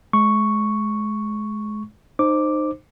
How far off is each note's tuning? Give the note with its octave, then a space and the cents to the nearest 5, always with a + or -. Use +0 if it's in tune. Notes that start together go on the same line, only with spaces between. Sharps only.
G#3 +30 C#6 +0
D#4 -25 C5 +5 D6 +0